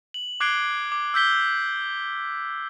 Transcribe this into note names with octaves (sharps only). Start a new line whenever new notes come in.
F#7
D6 F#6 G#6 C7 D7 G7
D6
E6 G6 B6 G7